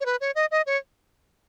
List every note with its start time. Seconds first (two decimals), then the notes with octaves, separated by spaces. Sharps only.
0.01 C#5
0.06 B4
0.21 C#5
0.35 D#5
0.51 D#5
0.66 C#5